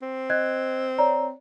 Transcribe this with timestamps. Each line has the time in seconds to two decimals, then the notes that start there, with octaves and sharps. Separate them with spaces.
0.02 C4
0.30 D#5 F#6 G#6
0.98 C#5 D5 A#5